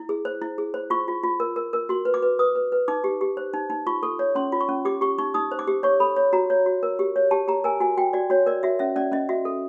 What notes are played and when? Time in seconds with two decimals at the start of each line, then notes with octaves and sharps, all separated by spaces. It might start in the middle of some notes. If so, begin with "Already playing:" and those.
Already playing: E4
0.09 G#4
0.25 C5
0.42 E4
0.58 G#4
0.74 C5
0.90 F4 C#6
1.08 F4
1.23 F4
1.40 A#4
1.56 A#4
1.73 A#4
1.89 F#4 C6
2.05 B4
2.14 D6
2.22 B4
2.39 B4 D#6
2.55 B4
2.72 B4
2.88 D#4 D6
3.04 G4
3.21 G4
3.37 C5
3.53 D#4
3.70 D#4
3.87 F4 C#6
4.03 A4 C#6
4.19 C#5
4.35 C#4 C6
4.52 F4
4.61 C#6
4.69 C#4
4.85 G4 D6
5.01 G4 C#6
5.18 D#4 C#6
5.34 D#4 D#6
5.52 C5
5.59 D6
5.67 G4
5.83 C#5 C#6
6.00 A4 B5
6.16 C#5
6.33 F#4 A#5
6.50 C#5
6.66 F#4
6.83 A#4
6.99 G4
7.16 C#5
7.31 G4 A5
7.48 G4 A#5
7.64 A#4 G#5
7.80 F#4 G#5
7.97 F#4 G5
8.13 F#4 D5
8.30 F#4 C#5
8.46 A#4 D5
8.63 F#4 E5
8.79 C#4 E5
8.96 C#4 D5
9.12 C#4 D#5
9.29 F#4 E5
9.45 A4